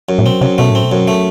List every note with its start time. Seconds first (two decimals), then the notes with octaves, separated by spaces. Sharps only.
0.09 F#2
0.19 A2
0.26 B2 C4
0.41 F#2 C3
0.58 B2 A3
0.71 A2 C4
0.83 B2
0.92 F#2
1.08 A3